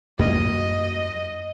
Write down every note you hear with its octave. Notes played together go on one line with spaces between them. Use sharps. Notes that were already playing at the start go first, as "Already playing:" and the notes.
F#2 A#3 D#5